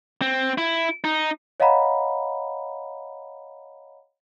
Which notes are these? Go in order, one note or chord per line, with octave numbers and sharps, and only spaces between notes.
C4
E4
D#4
C#5 D#5 F5 F#5 A#5 B5